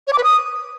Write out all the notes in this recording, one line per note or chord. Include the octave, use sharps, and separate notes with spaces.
C#5
D6
B4
D#6